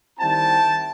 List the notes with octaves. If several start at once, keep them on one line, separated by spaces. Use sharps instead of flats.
D#3 G3 C4 E4 G5 A5